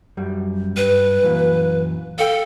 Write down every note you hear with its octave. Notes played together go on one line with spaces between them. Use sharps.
F#2 G3
G2 B4
F#2 A#2 E3
A4 F5 G5